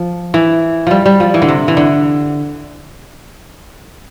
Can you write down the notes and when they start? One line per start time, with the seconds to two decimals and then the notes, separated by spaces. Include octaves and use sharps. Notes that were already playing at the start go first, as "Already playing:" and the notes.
Already playing: F3
0.34 E3
0.87 F3 G3
1.06 G3
1.20 F3
1.34 E3
1.42 D3
1.49 C3
1.68 E3
1.77 D3